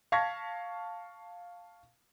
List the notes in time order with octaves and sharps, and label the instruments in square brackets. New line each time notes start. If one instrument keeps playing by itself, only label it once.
[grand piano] F5 A5 C#6 G#6 A#6 B6